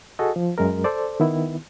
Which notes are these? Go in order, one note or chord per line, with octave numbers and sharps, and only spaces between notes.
F#4 G#4 A4 D#5
F3
F#2 G#3 A#4
A4 C5 D5
D#3 B3 E4